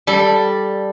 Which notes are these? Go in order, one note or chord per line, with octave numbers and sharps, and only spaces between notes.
G3 A4